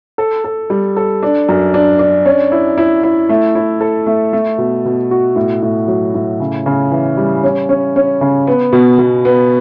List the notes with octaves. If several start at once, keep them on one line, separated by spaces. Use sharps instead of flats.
A4
A4
G3
A4
D4
F#2
D4
D4
C#4
E4
E4
E4
A3
E4
A4
A3
A3
B2
B2
F#4
A2
A2
F#3
A2
C#3
C#3
E3
G3
C#4
C#4
C#4
C#3
B3
B2
B2
B3